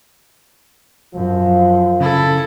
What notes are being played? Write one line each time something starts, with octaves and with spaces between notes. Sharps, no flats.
F#2 F3
C#3 E4 A4